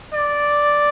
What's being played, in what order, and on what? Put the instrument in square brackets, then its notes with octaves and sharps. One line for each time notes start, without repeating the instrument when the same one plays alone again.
[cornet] D5